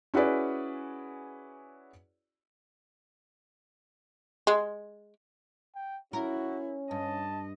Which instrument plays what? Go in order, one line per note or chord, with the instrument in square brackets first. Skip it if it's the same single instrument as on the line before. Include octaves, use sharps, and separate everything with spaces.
[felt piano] C#4 E4 F#4 G#4 B4 D5
[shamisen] G#3
[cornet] G5
[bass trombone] C#4 [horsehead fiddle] E4 [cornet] F#4 [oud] A#4
[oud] G2 [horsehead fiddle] D#5 [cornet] A5